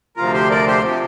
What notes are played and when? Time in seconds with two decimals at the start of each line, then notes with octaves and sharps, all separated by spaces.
0.17 D2 C3 F3 F4 A#4
0.33 G4 C5
0.50 A#4 D5
0.67 G4 C5
0.84 C3 F3 G4